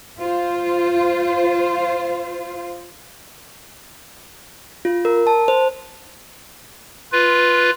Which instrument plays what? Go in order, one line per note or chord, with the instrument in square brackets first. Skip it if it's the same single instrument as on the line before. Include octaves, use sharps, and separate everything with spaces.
[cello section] F4 C5
[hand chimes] F4
A#4
A5
C5
[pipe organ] F4 B4